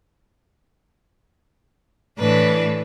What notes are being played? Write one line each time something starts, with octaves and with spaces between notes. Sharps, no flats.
A2 E3 D4 B4